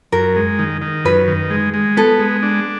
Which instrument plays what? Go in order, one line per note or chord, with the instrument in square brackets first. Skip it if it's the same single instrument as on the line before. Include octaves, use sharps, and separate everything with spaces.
[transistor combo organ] F#2 [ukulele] A#4
[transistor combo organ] G#3
D#3
D#3
[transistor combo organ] F#2 [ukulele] B4
[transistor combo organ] D#3
G#3
G#3
[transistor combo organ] B3 [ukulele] A4
[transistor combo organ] G#3
D4